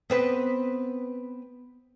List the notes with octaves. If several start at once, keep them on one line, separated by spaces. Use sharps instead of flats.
B3 C4 B4